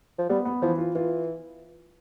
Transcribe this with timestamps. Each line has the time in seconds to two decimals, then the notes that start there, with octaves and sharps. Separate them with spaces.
0.18 F3
0.29 G3 B3
0.45 B3
0.62 E3 F3
0.78 F4
0.95 E3 F4